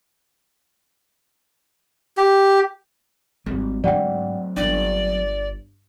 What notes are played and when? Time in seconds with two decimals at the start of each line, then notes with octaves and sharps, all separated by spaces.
2.17 G4
3.46 G#1 G3
3.84 G#2 D3 F#3 A3 C4 D5 F#5 G5
4.56 G1 D4 D5